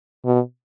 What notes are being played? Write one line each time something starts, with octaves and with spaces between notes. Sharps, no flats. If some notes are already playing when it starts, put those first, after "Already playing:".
B2